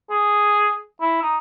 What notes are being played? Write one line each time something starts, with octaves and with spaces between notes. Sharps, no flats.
G#4
E4
D#4